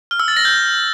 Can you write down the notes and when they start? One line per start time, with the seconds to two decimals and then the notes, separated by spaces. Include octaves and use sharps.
0.11 F6
0.20 E6
0.28 A6
0.37 A#6
0.45 G6